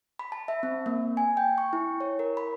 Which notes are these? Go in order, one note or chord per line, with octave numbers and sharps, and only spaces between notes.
B5
A5
E5
C4
A#3
G#5
G5
C#6
E4
C#5
A#4
B5